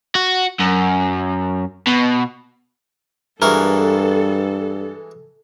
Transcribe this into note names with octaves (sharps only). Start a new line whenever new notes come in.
F#4
F#2
B2
G2 E3 G#3 F#4 A4 A#4